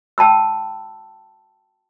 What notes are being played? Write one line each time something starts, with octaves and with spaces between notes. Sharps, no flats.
G5 A5 B5 E6